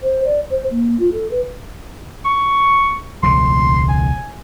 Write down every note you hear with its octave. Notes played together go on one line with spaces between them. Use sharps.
C5
D5
C5
A#3
F4
A4
B4
C#6
E1 C#2 C#3 C6
G#5